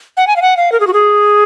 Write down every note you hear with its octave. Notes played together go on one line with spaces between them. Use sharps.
F#5
G#5
F5
F#5
F5
A#4
G#4
F#4
G#4